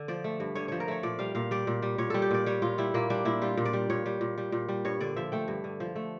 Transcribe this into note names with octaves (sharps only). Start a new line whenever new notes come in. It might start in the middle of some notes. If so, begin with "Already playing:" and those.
Already playing: D3
F3 D5
A3
G2
D3 C#5
F3 C#5
A#4
A3 C#5
A#2 D5
G3 F5
A#2 F5
G3 D5
A#2
G3
A#2 C#5
G3 A4
G4
A#2 D5
G3 C#5
A#2 F4
G3 E4
A#2 A#3
G3 D4
A#2 E4
G3 F4
A#2
D5
G3
A#2 C#5
G3
A#2
G3
A#2
G3
G2 C#5
D3 D5
F3 E5
A3 G5
G2
D3
F3
A3